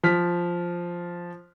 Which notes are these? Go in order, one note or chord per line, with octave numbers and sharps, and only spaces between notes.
F3 F6 B6